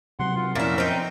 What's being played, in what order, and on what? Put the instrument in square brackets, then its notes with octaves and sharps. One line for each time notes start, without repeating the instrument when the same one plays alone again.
[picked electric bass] C3 F#3 [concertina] F#5 C6
[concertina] F4
[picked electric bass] F2 [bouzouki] A#2 E4 [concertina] C#4 A#4 E5
[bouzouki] C4 D#4